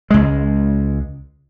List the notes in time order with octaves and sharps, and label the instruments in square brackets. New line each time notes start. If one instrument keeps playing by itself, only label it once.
[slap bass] C#2 G#3